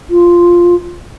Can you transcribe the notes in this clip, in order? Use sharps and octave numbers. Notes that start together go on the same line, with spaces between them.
F4